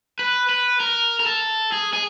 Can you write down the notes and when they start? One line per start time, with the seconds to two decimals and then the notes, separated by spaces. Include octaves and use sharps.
0.19 B4
0.49 B4
0.80 A#4
1.20 A#4
1.26 A4
1.72 G#4
1.93 G#4